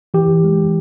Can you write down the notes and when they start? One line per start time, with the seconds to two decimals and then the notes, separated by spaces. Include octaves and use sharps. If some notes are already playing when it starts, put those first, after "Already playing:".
0.14 E3 G4
0.44 G#3